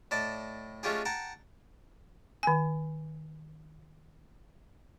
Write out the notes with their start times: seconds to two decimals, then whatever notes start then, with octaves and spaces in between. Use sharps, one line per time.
0.11 A2 D5 D#5 A5
0.83 G#3 A3 C#4 F4 G4 G#4
1.05 F#5 G5 A5 A#5
2.43 D#3 G#5